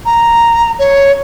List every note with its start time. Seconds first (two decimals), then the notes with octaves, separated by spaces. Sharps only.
0.05 A#5
0.79 C#5